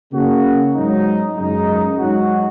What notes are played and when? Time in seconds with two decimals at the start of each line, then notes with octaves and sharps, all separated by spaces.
0.13 C#3 A#3 F#4
0.75 G#2 F#3 D#4
1.36 F#2 C#3 G#3 D#4
1.98 G#2 F#3 D#4 F#4